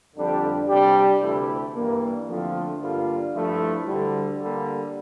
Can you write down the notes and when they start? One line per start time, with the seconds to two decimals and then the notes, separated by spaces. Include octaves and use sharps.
0.15 F2 D3 G3 D4 G4
0.68 C3 G3 D4 G4
1.22 D2 C3 E3 A3 E4
1.75 G2 E3 G3 A#3
2.28 D3 F3 A3 C4 F4
2.81 G2 D3 G3 A#3 F4
3.34 G2 F3 A3 E4
3.87 D2 D3 G3
4.40 D3 G3 A#3